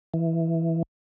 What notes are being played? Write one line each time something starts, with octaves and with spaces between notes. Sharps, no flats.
E3